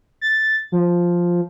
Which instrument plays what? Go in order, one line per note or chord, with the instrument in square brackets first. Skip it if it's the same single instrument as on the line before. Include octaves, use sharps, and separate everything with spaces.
[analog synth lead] A6
F3